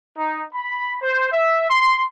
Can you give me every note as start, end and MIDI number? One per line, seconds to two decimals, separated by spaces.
0.17 0.43 63
0.53 0.96 83
1.00 1.29 72
1.31 1.66 76
1.69 2.04 84